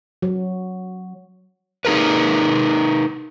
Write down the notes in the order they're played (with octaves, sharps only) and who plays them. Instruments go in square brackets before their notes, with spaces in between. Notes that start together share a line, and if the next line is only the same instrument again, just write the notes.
[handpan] F#3
[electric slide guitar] D#4 G#4 A#4 B4